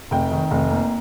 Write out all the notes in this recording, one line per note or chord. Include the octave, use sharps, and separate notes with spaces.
F1 G5
D#3
F1
A#3